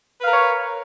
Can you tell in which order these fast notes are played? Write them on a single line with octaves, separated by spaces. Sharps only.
B4 F5 A#4 C#5